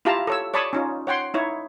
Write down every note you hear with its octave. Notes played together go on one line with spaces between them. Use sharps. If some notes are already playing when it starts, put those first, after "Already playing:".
E4 F4 G4 F5 A5 A#5
A4 C#5 E6
C#5 D5 A5 B5 C#6 D#6
C#4 D#4 F4
C#5 F#5 G5 C6
D#4 E4 C#5